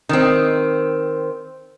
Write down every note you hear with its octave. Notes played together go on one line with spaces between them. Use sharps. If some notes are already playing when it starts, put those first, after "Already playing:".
D#3 C4